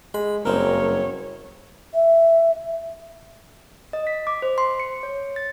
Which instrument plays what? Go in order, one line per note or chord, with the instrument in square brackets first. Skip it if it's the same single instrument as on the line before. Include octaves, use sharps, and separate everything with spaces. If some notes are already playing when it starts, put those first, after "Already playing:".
[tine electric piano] G#3 [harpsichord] B5
[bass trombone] F#1 [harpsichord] G2 C4 [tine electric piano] A#4 [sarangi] C#5
[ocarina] E5
[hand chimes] D#5
B6
D6
C5
C6
C#7
C#5
A6